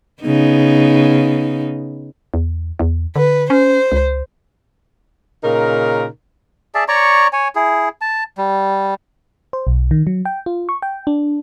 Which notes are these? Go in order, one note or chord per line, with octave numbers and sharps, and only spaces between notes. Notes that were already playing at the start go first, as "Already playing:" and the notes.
C#3 B3 D#4
E2
E2
D3 B4
C#4 C5
C#2
A#2 C#3 D#4 A#4
G#4 D5 E5 A5
C#5 D5 A#5 C#6
C#5 G#5
E4 G#4
A5
G3
C5
B1
D#3
F#3
G5
F4
C#6
G5
D4